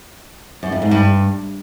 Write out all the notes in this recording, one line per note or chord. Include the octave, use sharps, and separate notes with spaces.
F#2
F2
G#2
G2